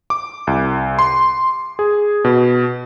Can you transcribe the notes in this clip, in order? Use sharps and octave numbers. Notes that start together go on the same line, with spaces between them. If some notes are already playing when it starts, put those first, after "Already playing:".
D6
C2
C6
G#4
B2